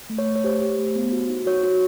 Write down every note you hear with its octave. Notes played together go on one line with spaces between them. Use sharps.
A3
C#5
A3
C#5
G4 C5
G4
A3
B3
F#4
D#4
F#4 C#5
F#4